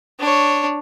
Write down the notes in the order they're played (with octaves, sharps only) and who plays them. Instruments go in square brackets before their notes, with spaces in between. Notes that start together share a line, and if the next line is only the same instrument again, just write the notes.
[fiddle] D4 C#5